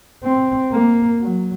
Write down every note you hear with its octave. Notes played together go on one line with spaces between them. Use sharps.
C4
A#3
F#3